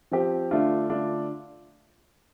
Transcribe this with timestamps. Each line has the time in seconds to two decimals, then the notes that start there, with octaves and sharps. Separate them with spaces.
0.12 F3 C4 G4
0.51 D3 A3 D4 F4
0.89 D3 A3 D4 F4